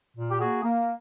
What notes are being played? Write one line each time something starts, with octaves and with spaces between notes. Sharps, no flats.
A#2
G4
A#3 F#4 G#4
A#3